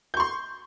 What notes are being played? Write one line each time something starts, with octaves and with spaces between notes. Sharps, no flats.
C6 C#6 G6